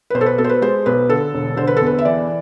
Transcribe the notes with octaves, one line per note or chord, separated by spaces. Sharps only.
B4
B1 C5
A4
B4
B2 A4
C5
B4
G#3 C5
B1 B4
D3 A4
E1
D3 C5
B4
E2 A4
B4
E5
E3 D5